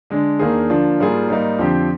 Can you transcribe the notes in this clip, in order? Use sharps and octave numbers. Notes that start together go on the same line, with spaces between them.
D3 G#3 D4
D#2 D#3 A#3 D4 G#4
D3 F3 A#3 D4
G#2 G3 A#3 F4 G#4
G#2 G3 A#3 D#4
F2 D3 F3 C4 G4